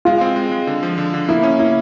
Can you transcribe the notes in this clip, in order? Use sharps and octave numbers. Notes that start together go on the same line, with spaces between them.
G#3 F4
C4
G#3
G#3
D3
F3
D3
D3
A#3 E4
C#4
A#3 E4